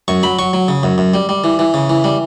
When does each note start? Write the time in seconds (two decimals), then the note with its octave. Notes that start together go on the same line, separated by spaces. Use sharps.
0.08 F#2 C#6
0.23 F#3 B5
0.39 F#3 C#6
0.53 F#3
0.68 C#3
0.83 F#2
0.98 F#2
1.14 G3
1.29 G3
1.44 E3
1.59 E3
1.74 C#3
1.89 E3
2.04 G3